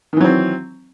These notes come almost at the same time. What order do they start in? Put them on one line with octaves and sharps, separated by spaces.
D#3 E3 F#3 C4